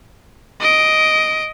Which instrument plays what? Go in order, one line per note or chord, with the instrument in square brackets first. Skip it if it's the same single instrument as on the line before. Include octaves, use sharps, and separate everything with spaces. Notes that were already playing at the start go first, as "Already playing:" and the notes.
[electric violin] D#5 D7